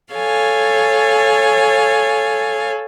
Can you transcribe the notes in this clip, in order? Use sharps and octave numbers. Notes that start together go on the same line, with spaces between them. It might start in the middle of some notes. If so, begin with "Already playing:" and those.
A4 C#5 F5 G#5